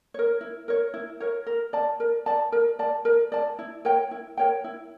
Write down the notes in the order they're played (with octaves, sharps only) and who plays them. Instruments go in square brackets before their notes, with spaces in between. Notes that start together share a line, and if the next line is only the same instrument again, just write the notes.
[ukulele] A#4 C#5
E4
A#4 C#5
E4
A#4 C#5
A#4
D5 A5
A#4
D5 A5
A#4
D5 A5
A#4
D5 A5
E4
A#4 C#5 G5
E4
A#4 C#5 G5
E4